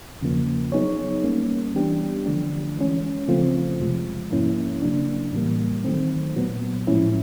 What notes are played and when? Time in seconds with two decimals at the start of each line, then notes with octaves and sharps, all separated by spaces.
0.21 E2 C#3 F3 A#3
0.72 F#3 B3 D#4 G#4 C#5
1.23 G3 A#3 C#4
1.75 E3 G3 B3 D4 G4
2.26 D3 F3 A3 D4
2.77 E3 G#3 C#4
3.28 C#3 F3 A3 C4 F4
3.80 F2 C3 F3 G#3
4.31 G#2 F3 A#3 C#4 E4
4.82 C#3 F#3 A#3 D4
5.33 A2 E3 G3 A#3
5.84 D#3 F#3 A3 C4
6.36 A#2 F#3 B3
6.87 A2 F3 G#3 C#4 E4